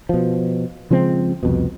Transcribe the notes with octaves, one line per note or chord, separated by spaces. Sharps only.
B2 F3
C#3 F3 G#3 C4
C2 F2 B2